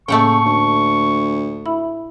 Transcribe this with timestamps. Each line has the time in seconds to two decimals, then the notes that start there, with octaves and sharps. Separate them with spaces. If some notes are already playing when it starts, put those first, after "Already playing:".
0.08 A2 C#3 A3 A#3 F#5 G5 C#6
0.46 D2
1.66 E4 E5 B5